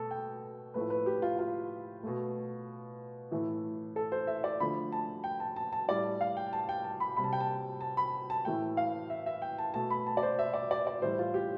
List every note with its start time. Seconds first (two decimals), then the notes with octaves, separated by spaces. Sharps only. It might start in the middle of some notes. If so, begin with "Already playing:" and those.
Already playing: B2 A3 A4
0.11 G5
0.74 A2 F3 A3 B4
0.90 B4
1.06 G4
1.22 F4
1.39 F4
2.03 B2 A3
3.31 A2 E3 A3
3.96 A4
4.12 C5
4.27 E5
4.44 D5
4.60 D3 F3 A3 B5
4.92 A5
5.24 G5
5.40 A5
5.56 A5
5.73 A5
5.88 A2 G3 D5
6.21 F5
6.37 G5
6.53 A5
6.69 G5
6.84 A5
7.00 B5
7.17 C3 G3 B5
7.24 A5
7.33 G5
7.40 A5
7.81 A5
7.97 B5
8.30 A5
8.45 A2 E3 A3 G5
8.77 F5
9.10 E5
9.26 E5
9.42 G5
9.58 A5
9.74 B2 A3 A5
9.90 B5
10.07 A5
10.17 D5
10.23 C5
10.39 E5
10.54 D5
10.71 D5
10.87 D5
11.02 A2 E3 G3 C5
11.19 F4
11.34 G4